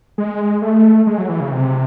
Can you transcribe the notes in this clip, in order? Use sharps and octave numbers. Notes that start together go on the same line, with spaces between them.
G#3
A3
G#3
F#3
E3
C#3
C3